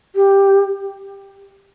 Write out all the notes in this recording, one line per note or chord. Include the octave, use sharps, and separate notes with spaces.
G4